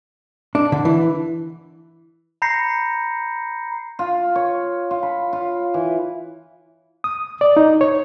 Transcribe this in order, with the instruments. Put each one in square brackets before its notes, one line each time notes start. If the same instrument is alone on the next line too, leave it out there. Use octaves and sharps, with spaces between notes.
[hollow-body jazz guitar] D4
D3
E3
[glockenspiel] A#5 B5 G6 A#6 C7 C#7
[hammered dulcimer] F4
C#5
F4
B5
F4
E3
[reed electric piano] D#6
D5
D#4
C#5